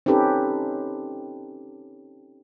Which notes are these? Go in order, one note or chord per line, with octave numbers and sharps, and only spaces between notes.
C4 C#4 D#4 G4 A4 B4